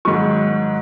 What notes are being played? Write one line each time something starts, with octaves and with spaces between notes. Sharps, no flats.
G#2 D#3 F#3 C#6